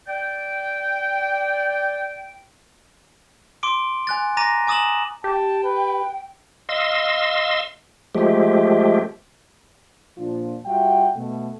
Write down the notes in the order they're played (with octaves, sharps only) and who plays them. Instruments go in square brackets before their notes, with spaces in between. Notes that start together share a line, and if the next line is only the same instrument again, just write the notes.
[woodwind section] D5 G5
[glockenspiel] C6 D6 D7
G#5 F#6 A6
A#5 D6 A6 A#6 D#7
G#5 D6 D#6 A6 E7 F#7
[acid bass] G4 [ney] G5 [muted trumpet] A5
[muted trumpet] B4
[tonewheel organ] D#5 F5 C6 E6
F3 G#3 A3 G4
[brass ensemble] A#2 F3 D4 F4
G3 F4 F#4 E5 F#5 G5
B2 A3